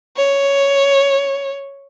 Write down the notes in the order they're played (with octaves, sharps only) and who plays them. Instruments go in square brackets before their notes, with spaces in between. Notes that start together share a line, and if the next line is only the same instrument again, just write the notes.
[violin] C#5